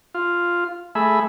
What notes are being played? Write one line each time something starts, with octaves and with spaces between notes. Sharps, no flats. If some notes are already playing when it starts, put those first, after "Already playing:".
F4
A3 G#4 E5 B5